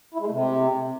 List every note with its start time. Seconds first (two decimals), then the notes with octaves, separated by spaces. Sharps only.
0.14 E4
0.20 G#3
0.26 A3
0.31 C3